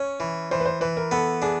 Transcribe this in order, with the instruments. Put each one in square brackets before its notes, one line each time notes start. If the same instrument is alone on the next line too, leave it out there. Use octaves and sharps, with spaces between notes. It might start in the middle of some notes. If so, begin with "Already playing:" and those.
Already playing: [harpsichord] C#4 [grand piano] C#5
[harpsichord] E3
[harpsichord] E3 [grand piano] C5
[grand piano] B4
C5
[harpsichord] E3 [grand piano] B4
[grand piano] A#4
[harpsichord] B3 [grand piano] A4
[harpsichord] D4 [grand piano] G#4